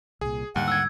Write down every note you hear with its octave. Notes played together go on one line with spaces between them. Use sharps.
C2 A#2 G#4
D#2 G#2 D3 G3 F#5
E6 G#6